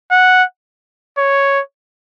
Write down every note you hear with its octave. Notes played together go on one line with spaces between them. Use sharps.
F#5
C#5